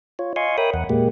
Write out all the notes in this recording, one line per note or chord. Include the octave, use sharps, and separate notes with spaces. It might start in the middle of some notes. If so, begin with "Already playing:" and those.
F4 C#5
D#5 F5 G#5 C6 C#6
A#4 C#5 E5 G5 B5 D#6
E2 F#5
A#2 G#3 A#3 G4